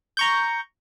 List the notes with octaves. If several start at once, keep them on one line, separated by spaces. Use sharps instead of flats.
A#5 C#6 G6